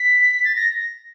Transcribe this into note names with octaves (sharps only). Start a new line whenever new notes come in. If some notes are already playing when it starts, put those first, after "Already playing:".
Already playing: B6
A6
A#6